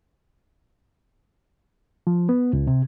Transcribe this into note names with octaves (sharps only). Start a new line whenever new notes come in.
F3
B3
C#2
C3